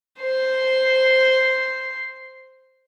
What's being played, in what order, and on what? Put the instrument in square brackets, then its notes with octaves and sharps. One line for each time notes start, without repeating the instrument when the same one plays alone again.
[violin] C5 C7